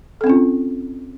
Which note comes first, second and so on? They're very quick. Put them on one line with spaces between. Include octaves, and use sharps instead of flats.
A4 C4 C#4 F4